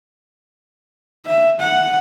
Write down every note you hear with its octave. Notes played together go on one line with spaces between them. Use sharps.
E5
F#5